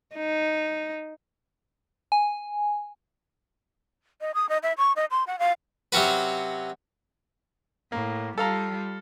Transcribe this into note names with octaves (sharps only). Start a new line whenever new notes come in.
D#4
G#5
D#5
D#6
D#5
E5
C#6
D#5
C6
F#5
F5
C3 F#3 C#4 F#4 B4
A2 A#3
G3 F4 A4 F5 A#5